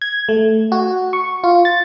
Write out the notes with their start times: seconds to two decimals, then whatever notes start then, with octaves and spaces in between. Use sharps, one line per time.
0.02 G#6
0.29 A3
0.72 F#4
1.13 C#6
1.44 F4
1.65 A6